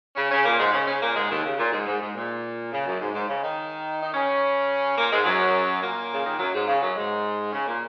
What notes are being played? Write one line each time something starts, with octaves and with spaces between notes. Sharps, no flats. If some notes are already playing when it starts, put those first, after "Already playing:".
C#3 C#4
C#3 C#4
A#2 A#3
G#2 G#3
C#3 C#4
C#3 C#4
A#2 A#3
G#2 G#3
D#2 D#3
C#3
A#2
G#2
G#2
G#2
A#2
C#3
F#2
G#2
G#2
C#3
D#3 D#4
D#4
C#3 C#4
A#2 A#3
G#2 G#3
F#2 F#3
A#2 A#3
C#3
D#3
F#2 F#3
G#2
C#3
F#2 F#3
G#2 G#3
C#3 C#4
A#2 A#3